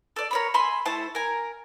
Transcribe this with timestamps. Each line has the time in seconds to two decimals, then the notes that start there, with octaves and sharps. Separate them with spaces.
0.16 A4 D5
0.31 A#4 C#5 B5
0.54 E5 G#5 B5 C6
0.85 A3 E4 C5 A5
1.15 A#4 G#5